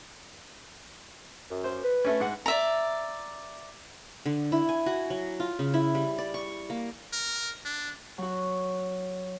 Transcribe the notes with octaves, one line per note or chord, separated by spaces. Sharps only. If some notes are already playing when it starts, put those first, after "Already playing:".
F#2
C5
B4
A3 C#4
G#2 F#5
D5 E5 A#5
D3
E4
G#5
F#4
F#3
F4
C#3
E4
G3
D5
C#6
A#3
A#4
D4
F#3 F#4